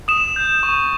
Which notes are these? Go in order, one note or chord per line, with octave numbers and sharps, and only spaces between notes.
D#6 E7
G6
C#6